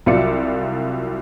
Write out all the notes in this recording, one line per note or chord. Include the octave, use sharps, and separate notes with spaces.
C2 F#3 F4 D5 E5 C#7